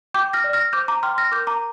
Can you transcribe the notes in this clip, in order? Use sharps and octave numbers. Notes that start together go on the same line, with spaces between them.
G5 D6 G6
F6 A#6
D5
F6 A#6
C5 D6 G6
A#5 D6
G5 C6 F6
F6 A#6
A#4 D6 G6
A#5 D6